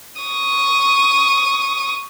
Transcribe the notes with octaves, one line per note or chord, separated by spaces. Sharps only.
C#6 D#6